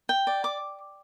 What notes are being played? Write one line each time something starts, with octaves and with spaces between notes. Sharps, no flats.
G5
D5
D6